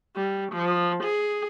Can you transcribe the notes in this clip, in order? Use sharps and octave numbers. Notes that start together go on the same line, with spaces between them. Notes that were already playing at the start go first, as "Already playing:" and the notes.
G3
F3
G#4